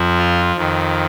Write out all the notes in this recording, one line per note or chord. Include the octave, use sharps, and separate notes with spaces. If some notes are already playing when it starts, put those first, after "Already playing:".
Already playing: F2 F3
F4
F2 D#3